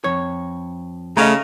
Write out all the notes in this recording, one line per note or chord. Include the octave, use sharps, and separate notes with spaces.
F2 C#5
C#3 A3 D#5 F5 A#5